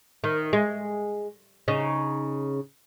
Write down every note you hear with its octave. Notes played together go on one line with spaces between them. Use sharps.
D#3
G#3
C#3 D#4